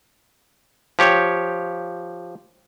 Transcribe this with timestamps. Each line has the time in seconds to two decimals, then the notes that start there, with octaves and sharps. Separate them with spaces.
0.99 F3 G4 C#5